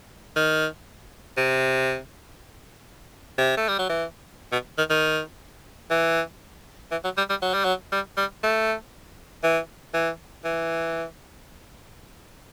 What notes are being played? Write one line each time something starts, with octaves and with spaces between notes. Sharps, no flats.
D#3
C3
C3
A3
G3
F#3
E3
B2
D#3
D#3
E3
E3
F#3
G3
G3
F#3
G3
F#3
G3
G3
A3
E3
E3
E3